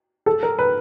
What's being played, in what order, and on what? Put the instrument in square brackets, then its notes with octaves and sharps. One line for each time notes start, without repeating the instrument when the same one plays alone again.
[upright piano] A4
A#4
B4